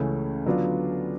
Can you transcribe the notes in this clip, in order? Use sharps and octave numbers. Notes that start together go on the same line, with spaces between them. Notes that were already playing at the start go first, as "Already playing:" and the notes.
Already playing: C#2 C#3 E3 A3 C#4
D3 F#3 B3 D4 F4